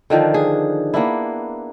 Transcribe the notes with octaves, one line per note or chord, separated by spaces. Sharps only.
D3 D#3 F3 D4
G#4
A#3 B3 D4 E4